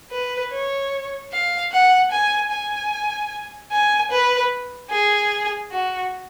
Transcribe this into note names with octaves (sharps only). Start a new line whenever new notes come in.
B4
C#5
F5
F#5
G#5
G#5
G#5
B4
G#4
F#4